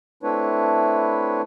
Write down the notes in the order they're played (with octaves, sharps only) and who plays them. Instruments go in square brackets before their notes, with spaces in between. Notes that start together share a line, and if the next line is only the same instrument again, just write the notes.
[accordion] A3 C4 D4 E4 B4 C#5